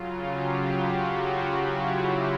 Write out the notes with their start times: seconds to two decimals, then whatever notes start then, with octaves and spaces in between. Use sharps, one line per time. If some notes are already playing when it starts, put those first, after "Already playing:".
Already playing: C#3 F#3 F4
0.20 G4
0.64 F#4
1.09 F4
1.55 E4